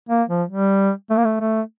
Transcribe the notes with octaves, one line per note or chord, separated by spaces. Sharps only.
A#3
F3
G3
A3
A#3
A3
A3